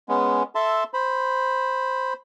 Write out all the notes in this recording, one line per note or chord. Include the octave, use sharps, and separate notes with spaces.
G#3 B3 C#4
A4 E5 A5 C6
C5 B5